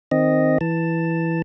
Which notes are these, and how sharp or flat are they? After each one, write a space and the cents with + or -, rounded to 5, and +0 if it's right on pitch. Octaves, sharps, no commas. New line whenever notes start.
D#3 +0 C4 +0 D#5 +0
E3 +0 A5 +10